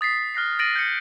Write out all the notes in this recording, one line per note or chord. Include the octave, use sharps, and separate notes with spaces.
D#6 A6 B6 C7
F6 F#6 A#6 C7
A6 A#6 D7 D#7 F#7
G6 A6 C#7